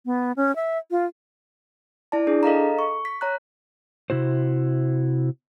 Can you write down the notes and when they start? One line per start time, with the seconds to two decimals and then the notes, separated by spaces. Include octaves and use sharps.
0.06 B3
0.36 C#4
0.56 E5
0.91 F4
2.12 E4 D5 A5
2.27 D4 G#4
2.43 A4 D#5 F5 A#5
2.79 C#6
3.05 B6
3.21 C#5 A#5 F#6
4.10 C3 E4 F#4 C5